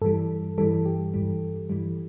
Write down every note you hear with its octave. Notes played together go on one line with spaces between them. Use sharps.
G2 E3 G3 A4
G2 E3 G3 A4
G4
G2 E3 G3
G2 E3 G3